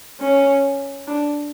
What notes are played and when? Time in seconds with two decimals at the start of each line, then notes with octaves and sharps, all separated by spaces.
0.20 C#4
1.07 D4